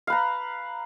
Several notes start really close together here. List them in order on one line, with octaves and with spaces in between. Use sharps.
F5 B4 A#5